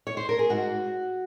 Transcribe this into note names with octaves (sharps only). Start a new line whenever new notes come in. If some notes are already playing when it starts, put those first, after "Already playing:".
C#5
C5
A#4
G#4
G#2 F#4